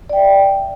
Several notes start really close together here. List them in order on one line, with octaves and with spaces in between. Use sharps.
D5 G5 E5